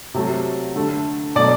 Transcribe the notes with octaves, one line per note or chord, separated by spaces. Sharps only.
C3 F#3 A3
D3 A3
B2 F#3 A3 D5